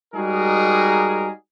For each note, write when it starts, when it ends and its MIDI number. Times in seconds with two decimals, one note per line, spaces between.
0.14 1.29 55
0.14 1.29 56
0.14 1.29 63
0.14 1.29 66
0.14 1.29 68
0.14 1.29 70